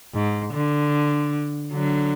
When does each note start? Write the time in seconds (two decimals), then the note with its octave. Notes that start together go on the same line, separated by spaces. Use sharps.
0.14 G#2
0.53 D3
1.73 D3 F#3